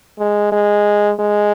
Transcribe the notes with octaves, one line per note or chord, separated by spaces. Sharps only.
G#3
G#3
G#3